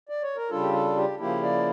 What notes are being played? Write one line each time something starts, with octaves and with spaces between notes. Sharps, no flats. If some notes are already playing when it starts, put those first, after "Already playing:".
D5
C#5
A#4
C#3 G3 D4 F4 A4
G4
A4
G4
C#3 F3 A#3 E4 G4
D5